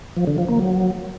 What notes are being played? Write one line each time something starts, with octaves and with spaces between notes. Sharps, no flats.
F3
D3
F3
A#3
F#3